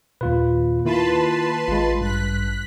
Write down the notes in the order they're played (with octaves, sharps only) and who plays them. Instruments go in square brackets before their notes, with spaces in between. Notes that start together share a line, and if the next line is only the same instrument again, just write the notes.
[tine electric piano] D#2 F4 B4 [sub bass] A#2
[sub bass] D#3 [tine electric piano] A#3 E4 F4 [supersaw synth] B4 A5 C6
[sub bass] A1 [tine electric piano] G#3 F4
[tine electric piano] G2 [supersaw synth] F#6 B6